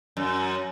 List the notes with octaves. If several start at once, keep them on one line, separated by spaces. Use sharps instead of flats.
F#2